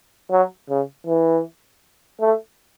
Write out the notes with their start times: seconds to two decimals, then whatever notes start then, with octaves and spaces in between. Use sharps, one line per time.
0.31 F#3
0.70 C#3
1.07 E3
2.21 A3